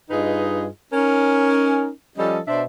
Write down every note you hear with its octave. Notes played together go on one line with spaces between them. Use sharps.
G2 D#4 F4 G#4 B4 D#5
C#4 D#4 A#4
F3 G3 C#4 A4 D#5
B2 D4 C5 D5 E5